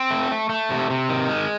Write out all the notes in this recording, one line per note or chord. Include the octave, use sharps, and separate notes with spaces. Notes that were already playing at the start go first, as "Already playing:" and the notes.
Already playing: C4
A3
A3
A3
C3
C3
D#3
G#3